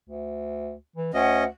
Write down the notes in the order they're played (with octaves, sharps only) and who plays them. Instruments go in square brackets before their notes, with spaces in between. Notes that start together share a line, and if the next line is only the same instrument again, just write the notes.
[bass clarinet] D2
E3
[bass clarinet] D2 [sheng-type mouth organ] C#4 D#5 [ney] F#5